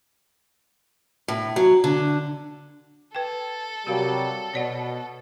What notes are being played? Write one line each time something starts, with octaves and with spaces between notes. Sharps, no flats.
A2
F#3
D3
A4 B4 G5
C3 F#3 G3 F#4 A#4 F5
B2 C#5 D5 F#5